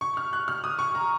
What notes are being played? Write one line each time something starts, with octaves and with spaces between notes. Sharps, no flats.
C#6
F6
F#6
F6
D#6
C#6
A#5